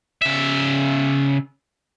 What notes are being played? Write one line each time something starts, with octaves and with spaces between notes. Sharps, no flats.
C#3 E5